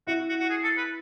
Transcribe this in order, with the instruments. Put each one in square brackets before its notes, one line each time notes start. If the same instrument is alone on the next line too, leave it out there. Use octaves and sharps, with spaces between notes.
[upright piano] E4 [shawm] F#4
[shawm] F#4
F#4
G#4
A4
B4